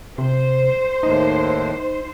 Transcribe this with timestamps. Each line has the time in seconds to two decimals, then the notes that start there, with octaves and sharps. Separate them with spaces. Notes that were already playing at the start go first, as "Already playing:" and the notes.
0.18 C3 C5
1.03 D#2 A2 D#4